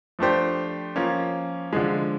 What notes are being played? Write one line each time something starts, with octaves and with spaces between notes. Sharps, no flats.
F3 A3 D4 G4 C5
F3 A#3 C#4
D3 F3 G#3